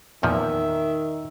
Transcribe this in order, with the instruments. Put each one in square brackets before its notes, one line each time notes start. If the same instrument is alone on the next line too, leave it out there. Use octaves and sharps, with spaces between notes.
[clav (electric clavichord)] E2 A#2 F3 [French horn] D#3 [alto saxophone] E5